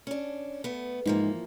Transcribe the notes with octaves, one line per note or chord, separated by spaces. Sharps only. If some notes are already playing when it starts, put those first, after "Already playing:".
C#4 D4
A3 B3
G#2 E3 F3 A#3